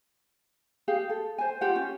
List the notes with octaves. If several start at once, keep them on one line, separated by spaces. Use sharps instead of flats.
G4 G#4 F5
A4
C5 G#5
F4 G4 F#5
C#4